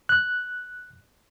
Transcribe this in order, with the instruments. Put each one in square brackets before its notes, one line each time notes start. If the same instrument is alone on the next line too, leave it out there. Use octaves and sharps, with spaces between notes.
[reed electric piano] F#6